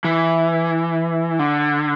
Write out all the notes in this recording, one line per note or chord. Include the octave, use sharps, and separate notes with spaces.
E3
D3